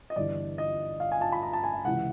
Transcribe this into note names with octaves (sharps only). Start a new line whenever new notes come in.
D#5
G1 G2 E3 D5
D#5
F5
G#5
A5
B5
A#5
A5
G#5
C#2 C3 E3 F#5